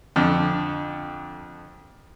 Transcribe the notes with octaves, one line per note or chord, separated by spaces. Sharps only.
F2 D3